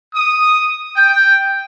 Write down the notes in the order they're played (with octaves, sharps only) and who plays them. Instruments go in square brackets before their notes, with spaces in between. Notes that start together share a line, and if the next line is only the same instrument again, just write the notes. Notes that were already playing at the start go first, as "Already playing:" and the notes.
[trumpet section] D#6
G5